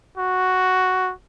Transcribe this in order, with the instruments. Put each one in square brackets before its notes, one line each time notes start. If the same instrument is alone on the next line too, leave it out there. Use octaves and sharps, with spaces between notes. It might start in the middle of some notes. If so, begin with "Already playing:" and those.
[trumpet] F#4